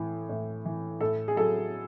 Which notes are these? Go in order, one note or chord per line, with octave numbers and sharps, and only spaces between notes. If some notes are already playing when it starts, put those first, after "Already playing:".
Already playing: A2 E3
A2
E3
A2 A4
G#4
F#3 A4